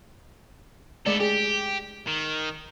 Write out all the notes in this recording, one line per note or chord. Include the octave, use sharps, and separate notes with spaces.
G#3 A3 B3 A4 D5
G4 G#4
D#3